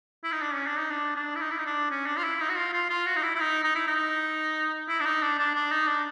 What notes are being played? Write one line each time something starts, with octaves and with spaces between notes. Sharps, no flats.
E4
D#4
D4
C#4
D4
D#4
D4
D4
E4
D#4
E4
D#4
D4
C#4
D4
F4
E4
D#4
F#4
F4
F4
F4
F#4
D#4
E4
E4
D#4
D#4
E4
D#4
E4
D4
D#4
D4
D4
D4
D#4
D4